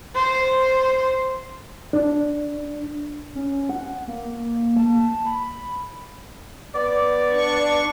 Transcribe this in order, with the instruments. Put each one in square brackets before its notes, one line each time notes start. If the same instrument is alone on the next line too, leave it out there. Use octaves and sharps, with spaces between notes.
[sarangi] C5
[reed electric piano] D4
[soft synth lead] C#4
F#5
A#3
A5
B5
[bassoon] B3 [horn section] D5
[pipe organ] D4 C#6